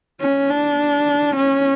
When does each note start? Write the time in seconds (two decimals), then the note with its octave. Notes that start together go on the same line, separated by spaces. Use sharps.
0.20 C#4
0.50 D4
1.36 C#4